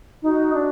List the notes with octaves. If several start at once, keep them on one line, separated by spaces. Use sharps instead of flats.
D#4 F#4
D4